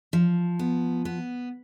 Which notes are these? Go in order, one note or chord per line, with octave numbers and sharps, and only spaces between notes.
F3
B3
B3